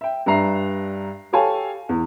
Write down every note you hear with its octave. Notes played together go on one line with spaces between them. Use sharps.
E5 G5
G2 D4 E5 A#5 C7
G4 A4 C#5 F5 G#5 A5
E2